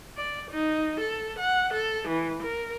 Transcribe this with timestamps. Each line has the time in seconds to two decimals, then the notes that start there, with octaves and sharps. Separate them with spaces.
0.17 D5
0.51 D#4
1.00 A4
1.38 F#5
1.73 A4
2.08 E3
2.43 A#4